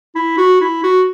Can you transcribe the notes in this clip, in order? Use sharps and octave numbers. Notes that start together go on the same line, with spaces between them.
E4
F#4
E4
F#4